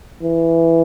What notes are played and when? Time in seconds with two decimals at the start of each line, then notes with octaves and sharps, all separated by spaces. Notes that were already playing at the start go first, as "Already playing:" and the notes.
0.23 E3